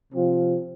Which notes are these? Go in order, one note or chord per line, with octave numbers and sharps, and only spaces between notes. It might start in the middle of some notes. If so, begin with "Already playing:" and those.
C3 F3 C4 F4